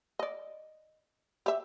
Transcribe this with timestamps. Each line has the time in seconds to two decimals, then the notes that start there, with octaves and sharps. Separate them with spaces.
0.19 D5 D#5
1.46 G4 E5